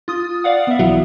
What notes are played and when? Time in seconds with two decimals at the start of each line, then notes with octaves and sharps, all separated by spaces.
0.08 F4 D#6
0.44 D5 F5 F#5
0.67 B3 E5
0.79 B1 E3 F#3